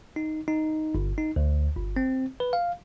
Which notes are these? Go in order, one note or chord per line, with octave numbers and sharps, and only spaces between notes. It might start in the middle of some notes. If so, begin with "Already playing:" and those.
D#4
D#4
G1
D#4
D2
G1
C4
B4
F5